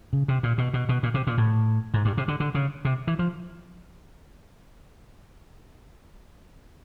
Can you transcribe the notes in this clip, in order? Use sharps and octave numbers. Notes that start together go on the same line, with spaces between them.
C#3
C3
A#2
B2
B2
B2
A#2
C3
A#2
A2
G#2
G2
C3
D3
D3
C#3
C3
E3
F3